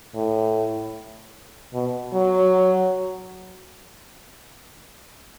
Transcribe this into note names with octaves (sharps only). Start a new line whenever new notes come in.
A2
B2
F#3